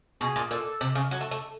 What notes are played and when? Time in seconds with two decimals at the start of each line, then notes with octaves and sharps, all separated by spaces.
0.21 B2 G#4
0.36 A#2
0.51 A#2 A4
0.81 C3
0.95 C#3
1.11 F#3
1.21 A3
1.31 A3